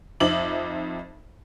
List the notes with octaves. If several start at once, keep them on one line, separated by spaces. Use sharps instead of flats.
F2 C4 D#4 E5 D6 F#7